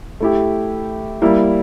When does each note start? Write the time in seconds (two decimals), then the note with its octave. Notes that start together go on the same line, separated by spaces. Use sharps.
0.20 A3 E4 G4
1.22 G3 A#3 E4